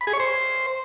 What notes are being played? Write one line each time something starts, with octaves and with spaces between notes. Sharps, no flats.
B5
G#4
C#5
C5